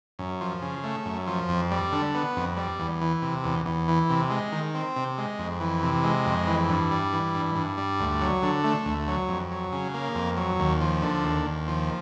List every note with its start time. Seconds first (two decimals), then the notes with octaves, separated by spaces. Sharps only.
0.19 F#2
0.41 F3
0.62 C#3
0.84 A3
1.05 F#2
1.27 F3
1.49 F2
1.71 G3
1.92 D3
2.15 B3
2.36 F2
2.57 G3
2.79 E2
3.01 E3
3.22 C3
3.44 E2
3.66 E2
3.88 E3
4.10 C3
4.30 G#3
4.52 D#3
4.75 C4
4.96 C3
5.18 G#3
5.39 F2
5.60 E3
5.83 C3
6.04 G#3
6.26 F2
6.47 E3
6.69 G2
6.91 G3
7.13 E3
7.34 G2
7.55 G2
7.78 G3
8.00 D2
8.21 F#3
8.43 D3
8.64 A3
8.85 D2
9.08 F#3
9.29 F2
9.51 F#3
9.72 C#3
9.94 A#3
10.15 F2
10.37 F#3
10.59 D#2
10.81 F3
11.02 D3
11.24 D#2
11.46 D#2
11.68 F3